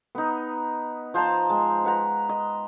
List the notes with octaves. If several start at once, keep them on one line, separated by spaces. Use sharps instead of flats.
B3 D#4
F3 C5 A5 A#5
G#3
B4 F#5 A#5
D#5